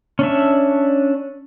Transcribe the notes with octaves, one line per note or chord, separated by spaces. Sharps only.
C#4 D4 E5